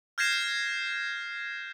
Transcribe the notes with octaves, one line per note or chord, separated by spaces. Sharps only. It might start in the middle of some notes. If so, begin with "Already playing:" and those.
F6 G6 G#6 A#6 C7 E7